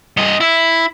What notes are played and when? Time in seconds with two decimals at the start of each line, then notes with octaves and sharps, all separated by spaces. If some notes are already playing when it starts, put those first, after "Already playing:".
0.17 G2 D#5
0.41 E4